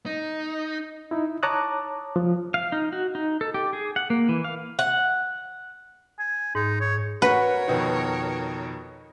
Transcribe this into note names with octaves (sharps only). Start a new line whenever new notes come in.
D#4
D#4 E4
C#5 A5 A#5 D6 D#6 F#6
F3
F5
D#4
F#4
D#4
A4
G4
G#4
F#5
A#3
E3
F5
F#5
G#5
G#2 D#4
C#5
F#4 A#4 B4 C#5 F#5
F2 B2 D#3